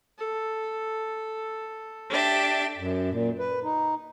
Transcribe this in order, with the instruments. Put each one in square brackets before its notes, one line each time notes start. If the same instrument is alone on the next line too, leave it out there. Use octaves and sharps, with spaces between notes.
[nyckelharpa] A4
[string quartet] D4 G4 E5
[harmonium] F#2
A#2
B4
D#4